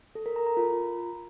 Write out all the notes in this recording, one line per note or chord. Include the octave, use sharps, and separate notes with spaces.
A4
A#4
A#5
A#5
F4